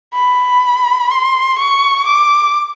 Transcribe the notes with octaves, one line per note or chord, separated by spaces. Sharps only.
B5
C6
C#6
D6